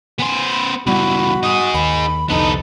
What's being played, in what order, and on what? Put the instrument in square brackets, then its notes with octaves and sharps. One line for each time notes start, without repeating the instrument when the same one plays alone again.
[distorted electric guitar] B3 C5 [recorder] G#5
[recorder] B5
[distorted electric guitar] C#2 E3 [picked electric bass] G3 B3 [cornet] F#4 [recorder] B5
[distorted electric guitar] D#4 G#4 [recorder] D#6
[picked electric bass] D#2 [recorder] B5
[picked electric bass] C2 F2 D3 [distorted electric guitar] B3 A4 [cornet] D#4 [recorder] B5